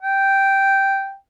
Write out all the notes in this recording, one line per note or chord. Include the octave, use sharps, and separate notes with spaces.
G5